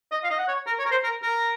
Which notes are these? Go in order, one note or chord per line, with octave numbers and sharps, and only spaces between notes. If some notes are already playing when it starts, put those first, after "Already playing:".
D#5
F5
D#5
F#5
C#5
A#4
C#5
A#4
C5
A#4
A#4